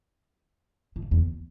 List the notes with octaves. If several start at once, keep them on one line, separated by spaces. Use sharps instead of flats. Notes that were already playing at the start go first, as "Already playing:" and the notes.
G2
E2